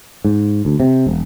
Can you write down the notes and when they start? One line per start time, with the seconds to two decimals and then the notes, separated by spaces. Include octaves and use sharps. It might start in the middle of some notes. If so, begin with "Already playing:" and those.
0.25 G#2
0.65 D2
0.80 C3
1.07 E1